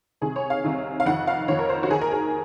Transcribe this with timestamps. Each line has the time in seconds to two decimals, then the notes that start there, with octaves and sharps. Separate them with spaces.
0.21 C2 C3 D#3 G#4
0.36 C#5
0.50 F5
0.64 C2 C3 D#3
1.00 F5
1.06 F2 D#3 F#5
1.27 F5
1.48 F2 D#3 C#5
1.59 A#4
1.69 C5
1.83 F#4
1.90 D#3 G#4
1.94 D#2
2.01 A#4
2.11 G#4